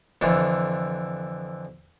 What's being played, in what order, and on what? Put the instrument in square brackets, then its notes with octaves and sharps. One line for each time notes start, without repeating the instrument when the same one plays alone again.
[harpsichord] F2 D3 E3